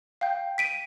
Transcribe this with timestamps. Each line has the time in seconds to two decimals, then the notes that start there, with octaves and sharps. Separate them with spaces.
0.21 F5 G5 G6
0.58 B6 D7 D#7